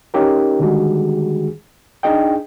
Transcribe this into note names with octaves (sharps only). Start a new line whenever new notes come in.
C#4 D#4 G4 A#4
D3 D#3 G3 G#3 F#4 G#4
D4 D#4 G#4 D#5 G5